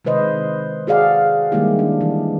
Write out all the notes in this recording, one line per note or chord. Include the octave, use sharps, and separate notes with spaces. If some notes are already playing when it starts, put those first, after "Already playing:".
C3 D#3 G#3 B4 C5 D#5
F#4 G#4 D5 F5 F#5
D#3 G3 G#3 A#3 E4 G4
D4
E3